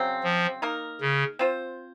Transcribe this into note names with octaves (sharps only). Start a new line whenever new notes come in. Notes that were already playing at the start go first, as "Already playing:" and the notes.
Already playing: C#3 F#3 C4
F3
A#3 D#4 A#4
C#3
C4 F4 C5